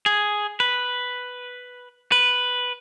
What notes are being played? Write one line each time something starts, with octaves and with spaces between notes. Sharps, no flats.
G#4
B4
B4